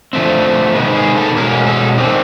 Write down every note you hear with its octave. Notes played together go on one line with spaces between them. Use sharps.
D3 F3 A3 C4
C3 D#3 G#3 B3
G#4
A4
B2 G#3 C#4 A#4
A4
D#3 G3 C4 G#4
A4